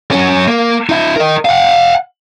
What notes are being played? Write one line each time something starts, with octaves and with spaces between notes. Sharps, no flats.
F#2 C#4
A#3
D#4 E5
A#4 D#5
F5 F#5